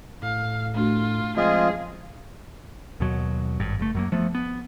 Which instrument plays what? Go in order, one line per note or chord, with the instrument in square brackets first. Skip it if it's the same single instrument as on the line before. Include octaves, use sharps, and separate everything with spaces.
[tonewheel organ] A2 [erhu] F5
[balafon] A3 D4 F#4 [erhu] F4
[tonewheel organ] F3 G#3 C4 [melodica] F4 D#5 [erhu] G#4
[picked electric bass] D#2 B2 F#3
G#1 G2
F#1 A3
F#2 F#3 A#3
F3 A3 B3
B3